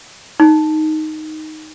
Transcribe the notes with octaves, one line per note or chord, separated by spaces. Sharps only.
D#4